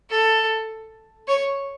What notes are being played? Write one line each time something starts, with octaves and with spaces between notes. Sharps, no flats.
A4
C#5